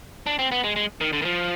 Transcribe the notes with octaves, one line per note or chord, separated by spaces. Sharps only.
D4
C4
B3
G#3
G#3
D#3
D3
D#3
F3